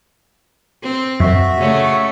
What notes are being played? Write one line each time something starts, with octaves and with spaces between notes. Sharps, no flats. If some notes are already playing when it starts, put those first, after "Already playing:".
C4
F#2 F#4 E5
C#3 A3